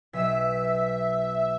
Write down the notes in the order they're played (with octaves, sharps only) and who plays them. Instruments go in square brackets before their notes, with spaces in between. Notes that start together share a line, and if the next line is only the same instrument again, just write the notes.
[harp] B1 B6 [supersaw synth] E5